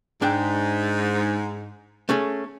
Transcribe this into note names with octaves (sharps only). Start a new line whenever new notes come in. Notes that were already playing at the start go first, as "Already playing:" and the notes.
G#2 D4 G5
A3 C#4 G#4